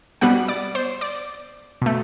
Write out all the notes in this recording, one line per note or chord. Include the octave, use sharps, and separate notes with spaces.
B2 G3 B3 F#5 F#6
D5 D6
C5 C6
D5 D6
B2 A3